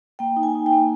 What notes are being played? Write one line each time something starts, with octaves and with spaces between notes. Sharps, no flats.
A#3 G5
D#4
G#5
D#4
G5
A#3